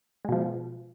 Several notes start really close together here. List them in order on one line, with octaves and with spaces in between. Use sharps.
G#3 B2 F3